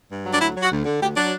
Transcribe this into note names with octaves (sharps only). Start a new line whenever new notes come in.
G2
F#3
D4
D2 E4
F#3
F#4
D2
D3
D2 G4
F#3 D4